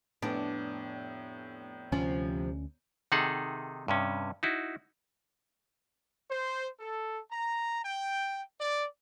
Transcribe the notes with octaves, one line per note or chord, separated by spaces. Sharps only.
F1 A2 B3 D4
D2 C3 F3 C#4 F4
C3 D#3 D#4 G#4 A4 F#5
G2 C3 C#4
D#4 E4 F#4
C5
A4
A#5
G5
D5